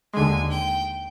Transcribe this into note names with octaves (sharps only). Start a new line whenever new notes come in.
D#2 D3 G#3 G#5
G5